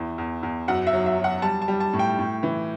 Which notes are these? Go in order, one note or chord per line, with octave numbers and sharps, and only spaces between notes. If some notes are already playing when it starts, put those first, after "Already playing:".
Already playing: E2 E3
E2
E2
F#2 F#5
E5
F#3
E5
F#3
F#5
G3 A5
A5
G3
A5
A2
G5
A2
E3